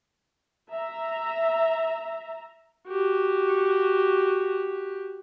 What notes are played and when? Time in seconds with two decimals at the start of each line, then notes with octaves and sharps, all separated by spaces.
0.72 E5 A#5
2.88 F#4 G4